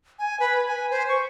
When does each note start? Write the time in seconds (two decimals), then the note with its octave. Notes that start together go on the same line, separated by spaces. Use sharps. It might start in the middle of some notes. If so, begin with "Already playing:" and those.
0.19 G#5
0.40 B4
0.66 G#5
0.90 C5
1.09 C#6